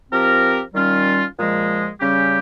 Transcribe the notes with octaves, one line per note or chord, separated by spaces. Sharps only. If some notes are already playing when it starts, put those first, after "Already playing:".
F3 C4 G4 A#4
D#3 G3 C#4 F4
A#2 F3 G#3
C#3 G3 C#4 G4